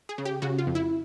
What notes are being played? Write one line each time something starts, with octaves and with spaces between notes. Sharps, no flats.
G#4
C#3
G4
C#3 F#4
F4
F2
E4